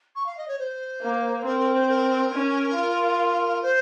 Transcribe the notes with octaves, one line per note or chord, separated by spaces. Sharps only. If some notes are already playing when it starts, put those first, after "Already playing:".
C#6
F5
D#5
C#5
C5
A#3
C4 A#4
A#4
C5
A#4
C#4
F4
C5